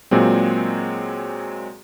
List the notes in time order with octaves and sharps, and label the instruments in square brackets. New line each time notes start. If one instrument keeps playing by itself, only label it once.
[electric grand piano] A#2 F#3 G#3 C4